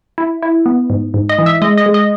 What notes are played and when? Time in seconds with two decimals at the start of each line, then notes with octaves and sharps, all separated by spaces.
0.18 E4
0.43 E4
0.66 B3
0.90 G#2
1.14 G#2
1.29 D#5
1.38 E3
1.46 E5
1.62 G#3 D#5
1.78 D#5
1.86 G#3
1.94 D#5